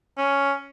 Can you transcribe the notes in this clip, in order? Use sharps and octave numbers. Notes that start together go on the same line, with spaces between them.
C#4